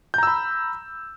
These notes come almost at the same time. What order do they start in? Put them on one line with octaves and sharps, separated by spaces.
G6 A#5 E6 B5